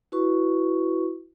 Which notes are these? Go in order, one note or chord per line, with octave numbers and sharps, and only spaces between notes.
E4 F#4 B4 C#6